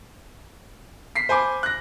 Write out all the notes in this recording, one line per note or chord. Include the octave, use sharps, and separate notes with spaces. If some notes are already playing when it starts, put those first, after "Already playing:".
B6 C7
C5 G#5 B5 D6
F#6 A#6